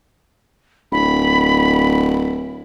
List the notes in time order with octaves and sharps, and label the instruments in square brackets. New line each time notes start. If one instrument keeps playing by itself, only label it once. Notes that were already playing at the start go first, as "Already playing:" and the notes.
[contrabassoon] D1 [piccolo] B5